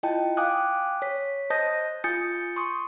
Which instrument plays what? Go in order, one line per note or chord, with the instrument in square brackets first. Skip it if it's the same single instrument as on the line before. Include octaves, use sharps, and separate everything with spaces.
[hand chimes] E4 F4 D#5 G5 A5
F5 G5 G#5 D6 D#6 F#6
C#5 B6
C5 D#5 A5 D#6 G6 A#6
F4 G#5 D#6 G6 A6 C#7
C6 C#6 D#6